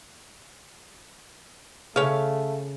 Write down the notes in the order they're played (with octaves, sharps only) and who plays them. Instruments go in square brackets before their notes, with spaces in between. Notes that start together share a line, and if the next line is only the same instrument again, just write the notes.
[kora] C#3 [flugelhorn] A3 [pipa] C#5 F5